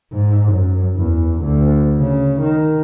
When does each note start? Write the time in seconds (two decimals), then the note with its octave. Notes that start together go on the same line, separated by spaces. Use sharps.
0.12 G#2
0.52 F#2
0.96 E2
1.42 D2
1.99 C#3
2.41 D#3